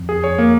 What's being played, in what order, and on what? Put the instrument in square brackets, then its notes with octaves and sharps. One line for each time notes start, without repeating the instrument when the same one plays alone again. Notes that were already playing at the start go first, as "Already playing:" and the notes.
Already playing: [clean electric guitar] F2
[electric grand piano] G#4
C#5
A#3